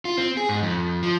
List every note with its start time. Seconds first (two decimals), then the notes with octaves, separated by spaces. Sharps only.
0.05 F4
0.18 C4
0.37 G#4
0.49 G#2
0.63 F2
1.03 F3